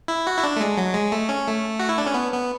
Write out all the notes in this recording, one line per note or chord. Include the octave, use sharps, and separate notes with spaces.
E4
F#4
E4
D4
A3
G#3
F#3
G#3
A3
C#4
A3
F#4
E4
D4
C#4
B3
B3